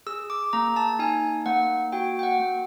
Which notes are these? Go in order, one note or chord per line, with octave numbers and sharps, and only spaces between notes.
G#4 E6
D6
A#3 A#5
A5
D#4 G#5
A#3 F#5
F#4 G5
G5
F#5
A#3